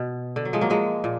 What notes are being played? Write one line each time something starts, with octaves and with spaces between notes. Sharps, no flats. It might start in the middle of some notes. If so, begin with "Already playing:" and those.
Already playing: B2
D3
F#3
F3 G#3
F#3 A#3
F3 G#3
A#2